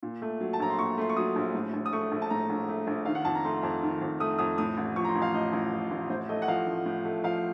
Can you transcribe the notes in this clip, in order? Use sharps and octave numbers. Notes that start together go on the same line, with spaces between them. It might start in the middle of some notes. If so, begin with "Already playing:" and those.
A#2
A3
F#3
A5
A#1 A#5
C6
A#2 C#6
A3 C6
C#6
F#3 D#6
A#1
A2
A#1
D#6
A3 C#6
A#1
A5
A2 A#5
A#1
A3
A#1
D#3 F5
F#5
F2 A5
A#5
A3 C6
F2
D#3
F2
A3 D#6
F2 D#6
A2 D#6
A1
F3 C#6
A#5
C6
A1
F5
A2 D#5
A1
F3
A1
A2 C5
A3 D#5
F#5
F3 F5
A1
A2
A3
F3 F5